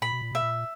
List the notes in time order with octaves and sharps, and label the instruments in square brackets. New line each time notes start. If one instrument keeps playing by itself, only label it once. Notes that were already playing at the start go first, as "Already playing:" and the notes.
[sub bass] A#2 [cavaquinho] B5
[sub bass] B2
A#2
[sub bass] B2 [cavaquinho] E5
[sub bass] A#2